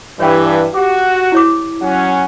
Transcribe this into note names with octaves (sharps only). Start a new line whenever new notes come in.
G2 E3 C#5 G5
F#4 G4 D6
E4 C#5 D6
F#3 C#4 F#5